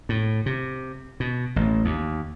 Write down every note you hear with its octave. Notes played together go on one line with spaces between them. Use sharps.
A2
C3
B2
A1
D#2